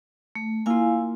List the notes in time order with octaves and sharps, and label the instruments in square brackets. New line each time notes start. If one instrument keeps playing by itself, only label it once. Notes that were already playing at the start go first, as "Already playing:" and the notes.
[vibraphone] A3
[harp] A#3 F4 [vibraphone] E4 F5 G#5